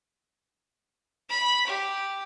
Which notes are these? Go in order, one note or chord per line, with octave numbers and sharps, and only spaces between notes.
B5
G4